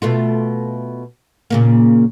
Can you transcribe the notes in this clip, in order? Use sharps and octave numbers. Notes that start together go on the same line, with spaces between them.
B2 A3 F4
A#2 C#3 A#3